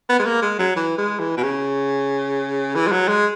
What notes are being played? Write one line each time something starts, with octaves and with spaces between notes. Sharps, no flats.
B3
G#3
A#3
G#3
F#3
E3
G#3
E3
B2
C#3
E3
G#3
F#3
G#3